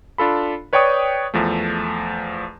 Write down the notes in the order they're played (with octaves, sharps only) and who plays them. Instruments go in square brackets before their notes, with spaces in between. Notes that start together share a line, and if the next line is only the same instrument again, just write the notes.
[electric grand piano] D4 F4 A4 B5
B4 C#5 D5 G5 C#6 D#6
E2 F3 A3